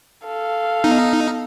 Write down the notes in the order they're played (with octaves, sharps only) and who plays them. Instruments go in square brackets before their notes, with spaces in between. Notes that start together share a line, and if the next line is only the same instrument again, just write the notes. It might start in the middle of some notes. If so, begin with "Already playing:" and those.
[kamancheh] A4 F5
[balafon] B3 [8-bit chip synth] D#4